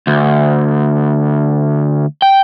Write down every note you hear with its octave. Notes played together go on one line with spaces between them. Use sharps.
D2
G5